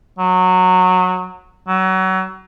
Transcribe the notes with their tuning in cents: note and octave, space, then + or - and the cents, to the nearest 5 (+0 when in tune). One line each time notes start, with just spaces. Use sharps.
F#3 -15
F#3 +30